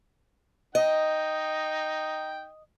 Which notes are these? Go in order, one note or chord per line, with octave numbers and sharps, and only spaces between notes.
D#4 D#5 G5